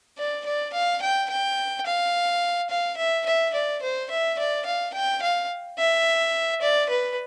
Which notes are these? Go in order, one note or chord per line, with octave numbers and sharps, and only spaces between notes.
D5
D5
F5
G5
G5
F5
F5
E5
E5
D5
C5
E5
D5
F5
G5
F5
E5
D5
B4